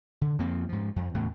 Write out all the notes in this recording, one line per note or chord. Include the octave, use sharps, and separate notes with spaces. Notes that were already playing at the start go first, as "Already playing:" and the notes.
D3
F2 F3 A#3 C4
G#2 F3
F2
E2 A2 C#3